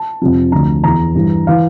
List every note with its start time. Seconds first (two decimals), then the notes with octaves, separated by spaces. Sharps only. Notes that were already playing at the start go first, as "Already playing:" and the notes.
Already playing: A5
0.22 F2 C3 F3
0.52 D2 D3 F3 A#5
0.84 E2 E3 A#5
1.15 G2 E3
1.47 E3 F5